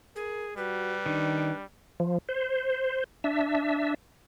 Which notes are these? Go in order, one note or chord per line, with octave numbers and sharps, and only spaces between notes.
G#4 A#4
G3 F#4 B4
D#3 D4
F3
C5
D4 E5